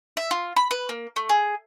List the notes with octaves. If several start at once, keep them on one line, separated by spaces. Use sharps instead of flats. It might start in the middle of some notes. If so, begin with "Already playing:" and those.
E5
F4
B5
B4
A#3
A3
G#4